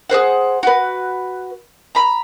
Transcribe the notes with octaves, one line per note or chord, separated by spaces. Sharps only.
G#4 B4 C5 F#5
F#4 B4
A#5 B5